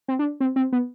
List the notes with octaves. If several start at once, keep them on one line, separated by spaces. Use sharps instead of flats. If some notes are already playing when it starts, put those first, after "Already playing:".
C4
D4
C4
C4
B3